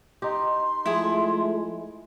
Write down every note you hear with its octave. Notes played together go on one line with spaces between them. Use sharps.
D#4 G4 C6
F3 G#3 A3 E4 G#4